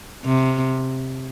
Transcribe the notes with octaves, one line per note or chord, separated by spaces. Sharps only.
C3